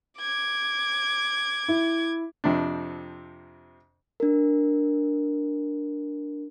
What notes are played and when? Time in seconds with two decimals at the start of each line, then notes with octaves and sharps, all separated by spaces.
0.20 D6 G#6
1.68 E4
2.44 F2 C3 C4 D4
4.20 D4 A#4